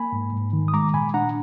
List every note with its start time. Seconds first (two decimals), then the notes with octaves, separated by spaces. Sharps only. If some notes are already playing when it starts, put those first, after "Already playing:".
Already playing: A#3 G#5 B5
0.12 G#2
0.33 G#2
0.53 D#3
0.68 D#6
0.73 G#3 A#5 D6
0.94 A#2 G#5 B5
1.14 D4 F#5 A#5